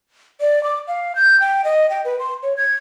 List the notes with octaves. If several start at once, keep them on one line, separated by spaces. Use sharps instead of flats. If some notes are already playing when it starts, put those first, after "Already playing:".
D5
D6
F5
G6
G5
D#5
G5
B4
C6
C#5
G#6